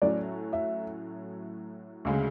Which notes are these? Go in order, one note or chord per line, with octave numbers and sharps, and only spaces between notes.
A2 F#3 A3 C#4 F#4 D5
E5
D2 C#3 G#3